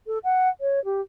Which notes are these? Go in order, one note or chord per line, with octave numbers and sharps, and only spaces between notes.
A4
F#5
C#5
G4